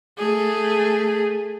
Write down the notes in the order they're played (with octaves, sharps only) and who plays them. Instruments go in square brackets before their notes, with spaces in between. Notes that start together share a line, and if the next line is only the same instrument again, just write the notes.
[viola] A3 G#4